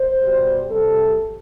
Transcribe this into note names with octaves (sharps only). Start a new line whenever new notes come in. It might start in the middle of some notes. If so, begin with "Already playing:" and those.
Already playing: C5
B2 G3
C3 G3 A4